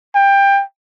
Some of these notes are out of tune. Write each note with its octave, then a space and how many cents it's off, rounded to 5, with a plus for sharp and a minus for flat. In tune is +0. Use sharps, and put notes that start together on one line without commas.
G5 +20